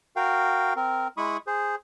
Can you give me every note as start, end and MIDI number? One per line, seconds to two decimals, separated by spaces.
0.16 0.73 66
0.16 0.73 70
0.16 0.73 77
0.16 0.73 79
0.76 1.08 60
0.76 1.08 70
1.17 1.37 56
1.17 1.37 64
1.17 1.37 83
1.17 1.37 85
1.17 1.37 87
1.47 1.75 68
1.47 1.75 72